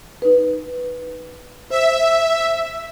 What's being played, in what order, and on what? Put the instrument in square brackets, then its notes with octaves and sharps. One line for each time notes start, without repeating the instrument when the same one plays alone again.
[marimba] D#4 B4
[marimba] C5 [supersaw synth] E5